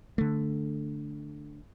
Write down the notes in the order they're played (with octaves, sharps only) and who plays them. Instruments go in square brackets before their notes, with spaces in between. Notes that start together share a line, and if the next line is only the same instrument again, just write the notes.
[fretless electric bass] D3 A3